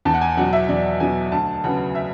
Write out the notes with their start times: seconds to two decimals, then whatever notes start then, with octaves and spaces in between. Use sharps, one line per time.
0.05 E2 A5
0.14 F#5
0.21 G#5
0.37 B2 F#3 F#5
0.53 E5
0.69 E2 D5
1.00 B2 F#3 G#5
1.32 D2 A5
1.64 C#3 F#3 B3 F#5
1.95 E5